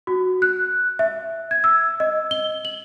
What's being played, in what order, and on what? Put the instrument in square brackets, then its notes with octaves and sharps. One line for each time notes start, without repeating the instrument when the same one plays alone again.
[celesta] F#4
F#6
E5
G#6
E6
D#5
G7
F#7